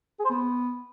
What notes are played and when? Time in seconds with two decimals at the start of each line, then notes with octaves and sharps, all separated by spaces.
0.19 G#4
0.25 C5
0.30 B3